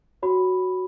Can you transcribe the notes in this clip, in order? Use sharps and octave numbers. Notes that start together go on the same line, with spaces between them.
F#4 C#5 B5